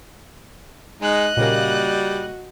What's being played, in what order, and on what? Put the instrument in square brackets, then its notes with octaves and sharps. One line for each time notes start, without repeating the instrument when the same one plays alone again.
[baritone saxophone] G#3 [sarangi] D#4 [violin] D#5 F#6
[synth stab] A#2 C#3 A#3 [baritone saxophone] G3 [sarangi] F#4